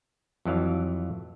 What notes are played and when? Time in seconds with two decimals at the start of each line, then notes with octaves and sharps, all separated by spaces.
0.45 F2 E3 F#3 F5